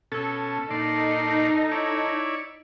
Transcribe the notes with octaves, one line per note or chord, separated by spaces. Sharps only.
B2 C#4 A4
A#2 D#4 D5 C6
E4 C#5 D5